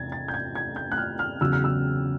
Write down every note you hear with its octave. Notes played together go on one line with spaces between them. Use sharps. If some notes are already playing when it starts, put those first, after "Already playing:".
Already playing: E2 C3 G#6 A6
A6
G6
G#6
G#6
G6
F#6
F6
F6
E2 C#3 F#3 E6
F6
E6